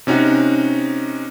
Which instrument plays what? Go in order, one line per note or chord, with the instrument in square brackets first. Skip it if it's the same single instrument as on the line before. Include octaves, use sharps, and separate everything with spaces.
[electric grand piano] C3 C#4 D#4 F#4